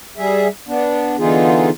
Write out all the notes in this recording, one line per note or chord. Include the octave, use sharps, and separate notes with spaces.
G3 G#4 E5
B3 D4
D3 E3 B3 D#4 F4 G#4